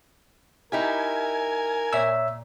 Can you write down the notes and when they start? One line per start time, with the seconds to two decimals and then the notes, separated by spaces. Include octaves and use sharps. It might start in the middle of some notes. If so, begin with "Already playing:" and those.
0.72 D#4 E4 G4 A#4 G#5
1.93 A#2 C#5 E5 E6